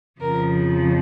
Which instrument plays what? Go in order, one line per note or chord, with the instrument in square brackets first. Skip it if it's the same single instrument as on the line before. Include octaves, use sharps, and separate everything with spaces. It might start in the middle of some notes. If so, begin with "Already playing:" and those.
[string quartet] F2 C#3 F3 A#4